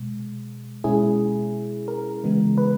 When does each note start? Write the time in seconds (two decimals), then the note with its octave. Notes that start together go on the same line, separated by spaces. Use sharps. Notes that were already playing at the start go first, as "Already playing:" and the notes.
Already playing: B2 G#3
0.84 B2 G#3 C#4 E4 G#4
1.88 A#4
2.24 C#3 E3 G#3 B3
2.58 B4